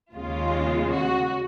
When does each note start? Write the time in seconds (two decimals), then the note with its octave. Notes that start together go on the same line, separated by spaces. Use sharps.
0.13 D#2 C#3 G#3 F4
0.90 F#4